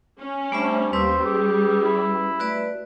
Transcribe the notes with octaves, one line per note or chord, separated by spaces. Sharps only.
C#4
G3 A3 D4 C5 E5
D#2 G3 C#4 B4 C5 E6
G4 G#4
E4
A3 F#4 B4 D5